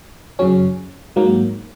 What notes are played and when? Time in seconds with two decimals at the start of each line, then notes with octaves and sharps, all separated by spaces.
0.39 F#2 C#3 F#3 C#4
1.16 G#2 F#3 A#3